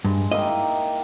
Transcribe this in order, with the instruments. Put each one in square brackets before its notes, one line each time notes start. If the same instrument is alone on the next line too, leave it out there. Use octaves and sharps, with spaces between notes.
[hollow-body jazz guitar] G2 [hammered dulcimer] G#3
[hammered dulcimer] A#3 E4 G4 [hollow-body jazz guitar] D#5
[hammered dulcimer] D#4